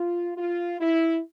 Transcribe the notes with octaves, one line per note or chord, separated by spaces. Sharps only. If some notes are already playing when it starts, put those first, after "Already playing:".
Already playing: F4
F4
E4